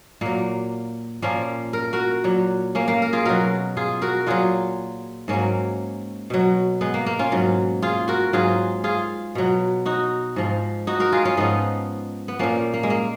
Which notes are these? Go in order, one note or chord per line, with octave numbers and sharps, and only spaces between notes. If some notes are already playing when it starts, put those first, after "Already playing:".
A#2 F#3 A#3
A#2 F3 A#3 C#4
A#4
F#4 A#4
A#2 F#3
A#3 C#4
A#3
A#4
F4 G#4
B2 F#3 F#4 A#4
F4 G#4
F#4 A#4
A#2 F#3 F4 G#4
G#2 F#3 A#3 C#4
B2 F#3
G#3 B3
A#3
A#3
C#4 F4
G#2 F#3
F4 G#4
F#4 A#4
G#2 F#3 F4 G#4
F4 G#4
B2 F#3
D#4 F#4
G#2 F3
D#4 F#4
F#4 A#4
F4 G#4
C#4 F4
G#2 F3 B3 D#4
B3
A#2 F3 A#3 C#4
A#3
G#3
A#3